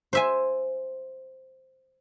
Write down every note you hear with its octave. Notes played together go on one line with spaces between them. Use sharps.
C5 E5 G#5